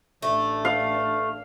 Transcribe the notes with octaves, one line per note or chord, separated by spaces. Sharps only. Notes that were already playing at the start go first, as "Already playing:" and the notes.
A1 A3 D4
F5